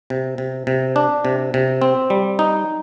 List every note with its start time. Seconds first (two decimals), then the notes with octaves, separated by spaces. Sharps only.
0.10 C3
0.38 C3
0.67 C3
0.96 D4
1.25 C3
1.54 C3
1.82 C4
2.10 G3
2.39 D#4